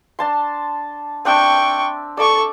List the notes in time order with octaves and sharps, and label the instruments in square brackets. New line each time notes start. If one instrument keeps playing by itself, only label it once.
[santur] D4 A5 C6
[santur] C4 D4 E5 [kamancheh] G5 C#6
[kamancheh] A4 C#6 [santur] D5 D6